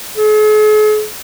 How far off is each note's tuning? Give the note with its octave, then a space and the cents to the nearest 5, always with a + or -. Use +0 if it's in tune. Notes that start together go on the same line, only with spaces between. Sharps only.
G#4 +45